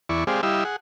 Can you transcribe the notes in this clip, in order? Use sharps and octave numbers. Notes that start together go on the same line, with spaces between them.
E2 E4 D5 C#6
G#3 C4 G4 G#4 D5 F5
G3 E4 G4 D#5 F5 E6
G#4 F#5